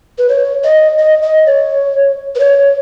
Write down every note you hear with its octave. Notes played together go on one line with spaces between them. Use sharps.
B4
C#5
D#5
D#5
D#5
C#5
B4
C#5